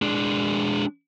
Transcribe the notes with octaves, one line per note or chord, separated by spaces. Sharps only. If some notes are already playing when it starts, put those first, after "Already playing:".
G#3 D4